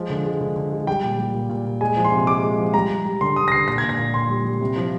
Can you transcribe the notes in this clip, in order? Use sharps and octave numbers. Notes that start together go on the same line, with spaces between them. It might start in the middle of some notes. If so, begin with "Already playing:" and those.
Already playing: F3 G#3
D3
G#3
D3
D3
G#3
G3 G5
A#2
G3
A#2
A#2
A#2
G#3 G#5
F3
C6
C3
G#3 D6
G#3
F3
G3 A#5
G3
G3
D3 C6
D3 D#6
A#6
D3 C7
A#2 A#6
G#6
A#2
A#6
A#2
A#2 C6
G3
G3
C3
F3